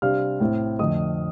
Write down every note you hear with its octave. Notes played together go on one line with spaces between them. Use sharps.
C3 G3 D4 F5 F6
A2 A3 C4
F2 D3 A3 D#5 D#6